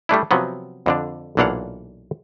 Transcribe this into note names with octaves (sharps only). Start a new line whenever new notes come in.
G3 A3 D4 E4
C3 F3 F#3 B3
F2 D3 D4
B1 A#2 E3 D4 F5 F#5